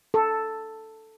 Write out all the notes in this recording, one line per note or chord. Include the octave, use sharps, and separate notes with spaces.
A4